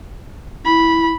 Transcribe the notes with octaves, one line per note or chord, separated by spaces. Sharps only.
E4 B5